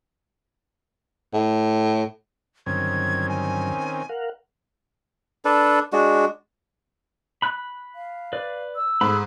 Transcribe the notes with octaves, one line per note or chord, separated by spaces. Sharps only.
A2
G2 D3 D#3 F#3 C4 C#4 G#6
G#5
A#4 F5 F#5
D4 A4 B4
G#3 D4 F#4
B5 F#6
F5
B4 D5
E6
G#2 G#4 A4 B5